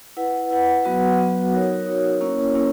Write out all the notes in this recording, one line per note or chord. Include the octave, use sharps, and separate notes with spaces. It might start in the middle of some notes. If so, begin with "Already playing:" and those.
E4 B4 F#5
E4 B4 F#5
F#3 B3 F#4 B4 F#5
F#3 B3 F#4 B4 F#5
D#4 F#4 A#4 C#5
D#4 F#4 A#4 C#5
A#3 C#4 E4 A#4 C#5
A#3 C#4 E4 A#4 C#5